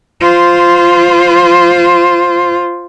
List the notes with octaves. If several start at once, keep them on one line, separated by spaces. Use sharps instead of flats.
F4 C5